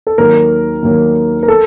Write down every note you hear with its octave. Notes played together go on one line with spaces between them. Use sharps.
A4
D#2 D#3 F#3 A#3 A#4
D#2 D#3 F#3 A#3
A#4
A4